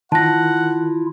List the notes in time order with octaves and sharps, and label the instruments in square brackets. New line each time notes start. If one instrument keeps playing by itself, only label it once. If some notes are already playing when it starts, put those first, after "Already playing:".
[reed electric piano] D#3 [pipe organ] E4 F4 [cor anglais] F#5 [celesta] A5 A#6